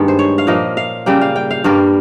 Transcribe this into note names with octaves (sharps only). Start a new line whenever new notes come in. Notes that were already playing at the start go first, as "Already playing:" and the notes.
Already playing: G2 D#3 G#3 A#3
C5
C#5
F5
A#2 F3 A#3 D#5
F5
C#3 G3 A#3 G5
F5
G5
F5
G2 G3 A#3 A#4